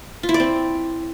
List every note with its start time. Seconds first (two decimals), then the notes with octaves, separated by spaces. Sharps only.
0.23 F4
0.29 E4
0.34 D5
0.40 C4